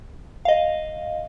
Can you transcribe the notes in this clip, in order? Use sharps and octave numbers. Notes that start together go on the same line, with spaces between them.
D#5 F5